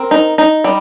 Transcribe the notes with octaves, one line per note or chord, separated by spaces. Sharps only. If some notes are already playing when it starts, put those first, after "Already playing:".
Already playing: C4 A#4
D#4
D#4
G3